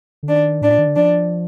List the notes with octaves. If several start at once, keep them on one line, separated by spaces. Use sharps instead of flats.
D3
D#3 D4
A2 D4
A#2
D#3
D3
F3 D4